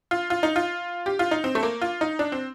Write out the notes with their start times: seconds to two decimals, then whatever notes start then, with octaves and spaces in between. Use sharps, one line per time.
0.11 F4
0.30 F4
0.43 D#4
0.56 F4
1.06 G4
1.19 F4
1.31 D#4
1.44 C4
1.55 A3
1.63 A#3
1.81 F4
2.01 D#4
2.19 D4
2.32 C4